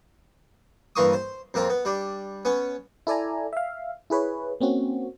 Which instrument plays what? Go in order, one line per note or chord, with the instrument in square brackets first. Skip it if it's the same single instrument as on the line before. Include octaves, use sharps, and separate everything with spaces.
[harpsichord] G2 E3 A#3 C6 C#6 D#6
C5
F2 A#3 C4 F4
B3
G3 D4
B3 C#4
[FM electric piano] E4 A4 D5 G#5 A#5
E5 F5
E4 G#4 B4 C#5
A#3 C4 C#4 F#4